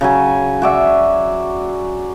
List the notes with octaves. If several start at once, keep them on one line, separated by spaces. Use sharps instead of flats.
C#3 F#3 G#5
F#4 D5 E5